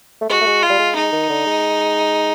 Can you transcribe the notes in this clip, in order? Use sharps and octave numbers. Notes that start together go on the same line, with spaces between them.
A3
G#3 F#4
A3
G#3
F4
G3
G#3
G#3 D#4
D#3
D3
G#3